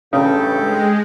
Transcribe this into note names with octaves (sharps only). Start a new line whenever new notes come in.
A1 G2 C#3 G4 A4 G5
G#3